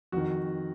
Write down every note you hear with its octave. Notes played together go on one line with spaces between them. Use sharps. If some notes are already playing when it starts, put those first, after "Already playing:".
F2 D#3 F#4